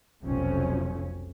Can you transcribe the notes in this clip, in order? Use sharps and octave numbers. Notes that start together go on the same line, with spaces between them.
F1 B1 F2 C3 F3 C#4